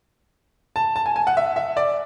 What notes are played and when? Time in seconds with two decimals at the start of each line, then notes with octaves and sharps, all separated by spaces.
0.76 A5
0.96 A5
1.06 G#5
1.16 G#5
1.27 F#5
1.37 E5
1.56 E5
1.77 D5